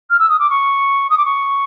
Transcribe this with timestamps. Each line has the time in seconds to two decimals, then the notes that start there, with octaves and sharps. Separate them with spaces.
0.10 F6
0.19 E6
0.29 D#6
0.39 D6
0.50 C#6
1.10 D#6
1.17 D6
1.25 C#6